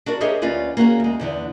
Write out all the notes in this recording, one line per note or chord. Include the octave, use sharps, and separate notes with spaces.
D4 F#4 A#4 D5
G4 G#4 A#4 C#5 D#5 E5
D2 C#4 F4 B4 D5
A#3 C#4 F#4 G#4
D2 G#3
E2 D3 E3